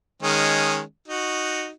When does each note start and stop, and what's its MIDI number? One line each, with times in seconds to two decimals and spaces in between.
0.23 0.80 51
0.23 0.80 56
0.23 0.80 61
1.08 1.70 63
1.08 1.70 66